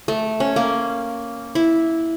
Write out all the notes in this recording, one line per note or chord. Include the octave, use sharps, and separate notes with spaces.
A3
C#4
A#3
E4